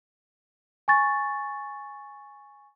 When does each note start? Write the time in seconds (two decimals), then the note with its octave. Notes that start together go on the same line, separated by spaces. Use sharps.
0.88 G#5 C#6 A6